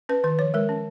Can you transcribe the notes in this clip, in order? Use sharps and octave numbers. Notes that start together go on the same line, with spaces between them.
C#4 B4
D#3 B4
F3 C#5
G#3 A#4
C#4